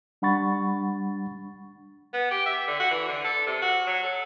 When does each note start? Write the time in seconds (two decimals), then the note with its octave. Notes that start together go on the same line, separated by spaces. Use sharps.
0.22 G3 D4 F#5 B5 C#6 A6
2.14 B3
2.31 G4
2.46 E5
2.67 D3
2.80 F#4
2.91 E3
3.08 D3
3.24 A4
3.46 C3
3.62 F#4
3.87 F#3
4.03 A4